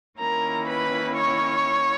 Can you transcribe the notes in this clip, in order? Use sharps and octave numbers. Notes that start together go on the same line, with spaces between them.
D#3 A#3 C#4 E4 A#4 A#5
B4 B5
C#5 C#6